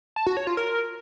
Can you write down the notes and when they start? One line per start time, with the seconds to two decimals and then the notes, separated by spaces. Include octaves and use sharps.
0.16 A5
0.27 F#4
0.37 C#5
0.47 F4
0.57 A#4